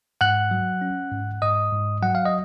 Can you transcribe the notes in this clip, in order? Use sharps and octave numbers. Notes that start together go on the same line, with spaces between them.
G#2 F#5 F#6
F#3
C#4
G#2
G#2 D#5 D#6
G#2
F#3 F#5
F5
D#5